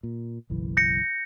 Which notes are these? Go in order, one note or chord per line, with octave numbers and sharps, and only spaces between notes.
A#2
F#1 B1 E3
G6 A#6 C#7